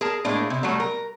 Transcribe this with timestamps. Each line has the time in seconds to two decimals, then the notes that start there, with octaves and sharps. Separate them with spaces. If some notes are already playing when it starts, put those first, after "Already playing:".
0.01 G#4 A#4 A5
0.25 A2 G#3 A#3 D4
0.50 C3
0.63 F#3 G3 A3
0.80 A#4